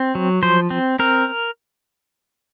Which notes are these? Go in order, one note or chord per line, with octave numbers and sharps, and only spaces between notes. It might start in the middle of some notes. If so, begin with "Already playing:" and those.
Already playing: C4
F#3
F3 C5
C4
C4 A#4